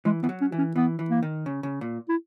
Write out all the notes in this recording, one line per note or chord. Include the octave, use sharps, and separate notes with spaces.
E3 G#3
E3 B3
F#3
C#4
E3
C#4
E3 B3
E3
A#3
D#3
C#3
C#3
A#2
E4